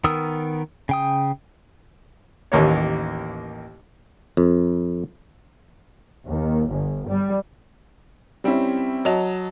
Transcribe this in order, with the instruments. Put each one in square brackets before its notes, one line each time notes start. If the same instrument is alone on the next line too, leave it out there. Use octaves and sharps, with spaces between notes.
[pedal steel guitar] D#3 B3 A#4 D#6 E6
C#3 G5 D#6
[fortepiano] A1 D#2 A#3 C#5
[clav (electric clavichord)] F2
[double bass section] D#2
G1
G3
[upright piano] G3 C4 C#4 E4 E5
F#3 D#5 A5 F7